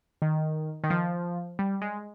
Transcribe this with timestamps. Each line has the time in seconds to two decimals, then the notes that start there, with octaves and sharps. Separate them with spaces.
0.22 D#3
0.84 D#3
0.90 F3
1.59 G3
1.82 G#3